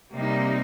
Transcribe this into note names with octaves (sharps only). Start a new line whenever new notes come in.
C3 G3 A#3 D#4